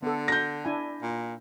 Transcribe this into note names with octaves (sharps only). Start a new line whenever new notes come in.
D3 B3 A4
G6 A#6
D4 E4 G#5
A#2